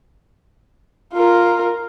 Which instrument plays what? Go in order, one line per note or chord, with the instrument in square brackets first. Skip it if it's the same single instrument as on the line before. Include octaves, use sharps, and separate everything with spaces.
[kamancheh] F4 A#4